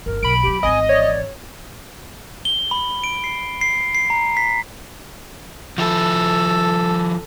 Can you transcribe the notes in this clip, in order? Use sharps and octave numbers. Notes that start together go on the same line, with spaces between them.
G1 G#3 A#4
B1 B5 D7
E2 F#3 G4
G#1 E3 D#5 G#5
C#5 D5
G7
B5
D7
C7
C7
C7
A#5
B6
F3 E4 A4